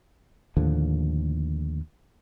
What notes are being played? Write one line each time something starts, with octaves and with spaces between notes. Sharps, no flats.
D#2 A2 D3 F3